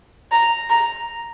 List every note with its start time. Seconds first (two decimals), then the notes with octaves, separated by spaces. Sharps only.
0.32 A#5
0.70 A#5